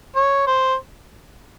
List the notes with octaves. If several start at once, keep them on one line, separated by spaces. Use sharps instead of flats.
C#5
C5